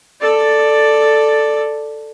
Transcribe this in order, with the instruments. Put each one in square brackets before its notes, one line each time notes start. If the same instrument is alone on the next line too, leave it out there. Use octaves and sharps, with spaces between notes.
[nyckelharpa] A4 D5